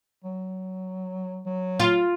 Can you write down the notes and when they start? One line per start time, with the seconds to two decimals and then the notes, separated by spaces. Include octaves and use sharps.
0.24 F#3
1.46 F#3
1.80 F4